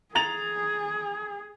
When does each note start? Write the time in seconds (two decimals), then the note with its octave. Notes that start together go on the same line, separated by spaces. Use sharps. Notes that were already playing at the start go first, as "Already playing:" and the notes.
0.15 G#4 A#5 A6 F7